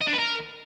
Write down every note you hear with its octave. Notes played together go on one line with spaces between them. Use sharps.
D#5
D4
B4
A#4